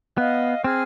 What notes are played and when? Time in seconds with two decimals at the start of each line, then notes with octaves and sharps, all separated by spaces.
0.18 B3 D#5 F5
0.64 C4 G#4 F6 G#6